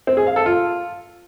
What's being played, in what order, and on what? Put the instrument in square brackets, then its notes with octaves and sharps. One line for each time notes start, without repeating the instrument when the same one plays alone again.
[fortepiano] C4
G#4
F5
A4
F4